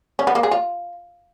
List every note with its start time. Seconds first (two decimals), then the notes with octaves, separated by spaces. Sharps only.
0.19 C#4
0.27 B3
0.35 A#3
0.43 G#4
0.51 F4